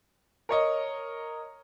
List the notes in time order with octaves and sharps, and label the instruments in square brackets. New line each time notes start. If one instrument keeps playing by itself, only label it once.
[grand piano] A#4 C#5 D#5